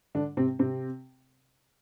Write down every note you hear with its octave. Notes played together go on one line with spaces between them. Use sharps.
D3 D4
C3 C4
C3 C4